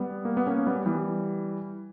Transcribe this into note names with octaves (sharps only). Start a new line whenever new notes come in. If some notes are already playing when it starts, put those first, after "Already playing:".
Already playing: G3 B3
A#3
B3
A#3 C#4
G3 B3
E3 G3